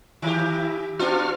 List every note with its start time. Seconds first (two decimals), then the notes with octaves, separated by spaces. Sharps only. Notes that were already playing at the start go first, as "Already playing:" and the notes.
0.22 D#3 E4 G4
1.00 B3 D4 F4 F#4 F6